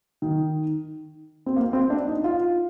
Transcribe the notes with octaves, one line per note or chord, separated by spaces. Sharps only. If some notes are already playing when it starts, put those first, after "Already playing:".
D#3
C4
A#3
C4
D4
D#4
F4